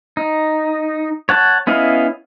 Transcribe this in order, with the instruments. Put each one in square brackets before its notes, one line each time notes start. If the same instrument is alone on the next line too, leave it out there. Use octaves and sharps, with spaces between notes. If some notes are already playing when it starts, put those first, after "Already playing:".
[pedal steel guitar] D#4
C#5 F#5 A5
B3 C#4 E4 D#5 F5